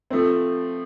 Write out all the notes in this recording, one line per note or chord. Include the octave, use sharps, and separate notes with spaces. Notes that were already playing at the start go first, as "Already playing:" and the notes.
F3 A3 C4